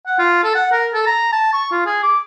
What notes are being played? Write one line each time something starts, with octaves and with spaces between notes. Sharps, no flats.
F#5
F4
A4
F#5
A#4
A4
A#5
A5
C#6
F4
G#4
D6